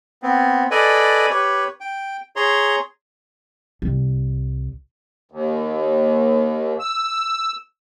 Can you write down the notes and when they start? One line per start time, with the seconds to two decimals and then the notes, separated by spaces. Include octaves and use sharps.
0.23 B3 C4
0.71 A4 B4 D5 D#5 G#5
1.30 G4 B4 C#5
1.81 G5
2.36 G#4 C#5 A#5 C6
3.82 C2
5.31 D#2
6.80 E6